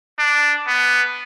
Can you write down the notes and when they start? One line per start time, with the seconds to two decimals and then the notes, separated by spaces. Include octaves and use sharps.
0.19 D4
0.68 B3